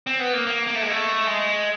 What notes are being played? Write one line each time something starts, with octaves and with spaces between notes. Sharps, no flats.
C4
B3
A#3
A#3
A#3
A3
G#3
A3
G#3